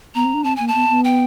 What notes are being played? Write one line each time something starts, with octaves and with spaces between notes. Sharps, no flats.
B3 A#5
C4
D4
C4 A5
A#3 G#5
A5
B3
B3
G5